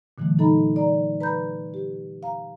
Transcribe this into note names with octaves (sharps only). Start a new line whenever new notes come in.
A#2 D3 E3 F#3 A3
D#4 A4 D#5 A#5 B5
D5 A#5
B4 A#5 B5 G6
G4
F5 A#5